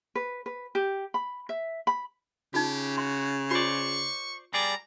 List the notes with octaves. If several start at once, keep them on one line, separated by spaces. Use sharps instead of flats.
B4
B4
G4
B5
E5
B5
C#3 D#4 F4 G4
F#4 C6
F4 C5 D5 C#6
G3 G#4 D5 A#5